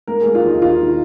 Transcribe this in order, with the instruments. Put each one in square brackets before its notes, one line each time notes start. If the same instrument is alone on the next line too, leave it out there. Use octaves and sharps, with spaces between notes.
[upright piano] A#3 A#4
A#3 G#4
F4
D#2 D#4
D#2 F4